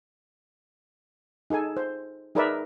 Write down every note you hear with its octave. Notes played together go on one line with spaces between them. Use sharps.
D#4 G#4 A4 G#5
C5
D#4 G#4 A#4 B4 D5 E5